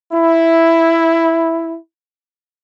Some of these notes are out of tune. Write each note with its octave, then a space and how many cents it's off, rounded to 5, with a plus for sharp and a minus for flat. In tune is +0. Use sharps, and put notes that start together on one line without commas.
E4 +0